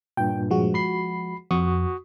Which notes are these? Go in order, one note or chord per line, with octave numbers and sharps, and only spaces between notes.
G2 A#2 G5
F3 G#3 F#4
B5 C7
F2 F#4 C#6 D#6